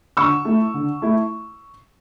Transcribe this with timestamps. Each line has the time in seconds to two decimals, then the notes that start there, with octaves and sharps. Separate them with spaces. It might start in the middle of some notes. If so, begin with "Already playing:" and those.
0.17 D3 C#6 E6
0.45 A3 E4
0.74 D3
1.02 A3 E4